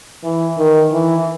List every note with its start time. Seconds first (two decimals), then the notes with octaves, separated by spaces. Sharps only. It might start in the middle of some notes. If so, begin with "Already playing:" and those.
0.24 E3
0.58 D#3
0.92 E3